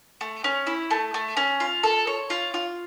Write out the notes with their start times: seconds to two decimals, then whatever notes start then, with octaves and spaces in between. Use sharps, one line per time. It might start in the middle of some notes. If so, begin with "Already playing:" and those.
0.21 A3
0.44 C#4
0.67 E4
0.91 A3
1.14 A3
1.37 C#4
1.60 F4
1.83 A4
2.07 C#5
2.30 F4
2.54 F4